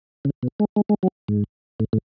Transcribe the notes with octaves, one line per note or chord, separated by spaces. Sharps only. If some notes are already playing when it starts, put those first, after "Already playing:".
C#3
B2
G#3
G#3
G#3
F#3
G#2
A2
A2